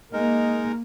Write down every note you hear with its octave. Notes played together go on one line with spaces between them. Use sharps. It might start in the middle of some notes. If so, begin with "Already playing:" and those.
G#3 A#3 D#4 A#4